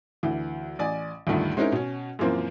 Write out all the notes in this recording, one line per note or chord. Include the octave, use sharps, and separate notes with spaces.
D2 E3
A1 D5 G#5
D2 G2 A#2 D#3 A3
G#3 C4 C#4 D#4 E4 A#4
B2 C#4
F#2 A#2 E3 F3 A#3 C4